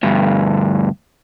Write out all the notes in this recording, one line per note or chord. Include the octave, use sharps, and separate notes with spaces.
D2 G2